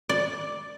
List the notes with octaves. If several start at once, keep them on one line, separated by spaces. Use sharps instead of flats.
D5